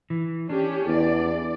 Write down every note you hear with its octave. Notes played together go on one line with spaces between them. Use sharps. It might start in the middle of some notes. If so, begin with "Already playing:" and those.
E3
C#4 D4 G4
E2 D5